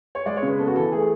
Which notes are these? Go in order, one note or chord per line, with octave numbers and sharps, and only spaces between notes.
C#5
G#3 D5
C#5
C#3
B4
B3 A4
F#4
E3 A4
A3 G#4